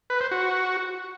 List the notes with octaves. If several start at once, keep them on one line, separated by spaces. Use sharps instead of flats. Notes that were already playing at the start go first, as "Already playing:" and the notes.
B4
C5
F#4